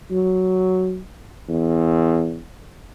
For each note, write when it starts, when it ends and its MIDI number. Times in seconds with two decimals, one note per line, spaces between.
0.11 1.01 54
1.49 2.40 40